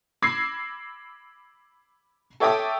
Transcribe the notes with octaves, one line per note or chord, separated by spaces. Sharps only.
B5 D6 E6 G#6 A#6 C7
A4 C#5 E5 G5 D6 D#6